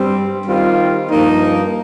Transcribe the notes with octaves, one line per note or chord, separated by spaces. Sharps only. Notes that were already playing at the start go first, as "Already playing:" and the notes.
Already playing: G2 G3 C4
D#3 G3 C4 F4
G2 F3 A#3 D#4